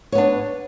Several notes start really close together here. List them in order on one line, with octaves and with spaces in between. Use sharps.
C#5 B3 D4